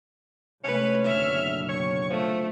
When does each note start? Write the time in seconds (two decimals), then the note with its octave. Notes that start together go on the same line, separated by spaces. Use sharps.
0.64 C3 G#3 A3 C#4 B4
1.04 F#1 B2 D3 E5 F6
1.69 C#5 C#6
2.10 F3 A3